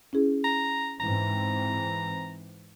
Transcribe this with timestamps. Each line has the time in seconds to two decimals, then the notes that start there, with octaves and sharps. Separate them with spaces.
0.13 C#4 E4 G#4
0.44 A#5
1.00 G#2 E3 C4 A#5